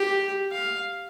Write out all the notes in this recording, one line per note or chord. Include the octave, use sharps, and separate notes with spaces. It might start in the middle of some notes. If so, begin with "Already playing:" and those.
Already playing: G4
F5